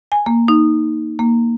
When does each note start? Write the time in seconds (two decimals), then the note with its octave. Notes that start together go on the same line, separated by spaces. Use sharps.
0.12 G#5
0.26 A#3
0.48 D#4
1.19 A#3